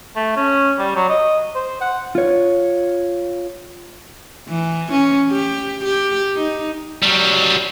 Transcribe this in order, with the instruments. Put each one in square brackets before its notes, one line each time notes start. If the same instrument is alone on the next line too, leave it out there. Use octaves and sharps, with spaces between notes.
[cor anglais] A3
C#4
G3
F#3
D#5
C5
F#5
[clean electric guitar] F4 C#5
[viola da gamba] E3
C#4
G4
G4
D#4
[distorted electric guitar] F#3 G3